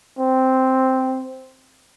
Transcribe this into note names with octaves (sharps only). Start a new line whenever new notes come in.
C4